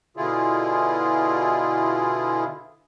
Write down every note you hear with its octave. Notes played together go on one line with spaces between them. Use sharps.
B2 D3 E4 F4 G#4